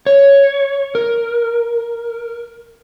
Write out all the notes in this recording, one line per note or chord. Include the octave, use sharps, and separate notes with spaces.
C#5
A#4